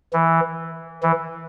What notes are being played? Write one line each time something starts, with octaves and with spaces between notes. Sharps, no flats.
E3
E3